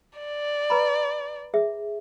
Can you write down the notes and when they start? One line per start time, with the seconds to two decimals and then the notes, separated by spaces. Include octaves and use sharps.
0.19 D5
0.70 B4 A#5 B5
1.54 G#4 E5